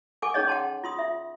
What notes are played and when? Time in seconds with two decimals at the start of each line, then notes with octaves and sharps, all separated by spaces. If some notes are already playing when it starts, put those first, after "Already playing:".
0.22 A4 F#5 G#5 C#6 D6
0.34 C#4 D#4 G#4 C#5 D#5
0.48 F#5 G5 A5 C6
0.84 F4 C6 D#6
0.99 F4 E5